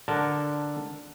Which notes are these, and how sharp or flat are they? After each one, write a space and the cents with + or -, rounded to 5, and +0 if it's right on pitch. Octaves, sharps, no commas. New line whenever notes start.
D3 +0 A#4 +0 A5 +0